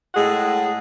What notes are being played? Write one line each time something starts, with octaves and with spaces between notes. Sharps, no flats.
A2 G#3 G#4 F#5